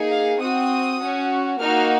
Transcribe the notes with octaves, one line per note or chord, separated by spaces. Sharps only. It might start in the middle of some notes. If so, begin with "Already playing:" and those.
Already playing: A#3 D#4 G#4
F5
C4 F#4 D#6
C#4 F#4
A#3 D#4 F#4 F6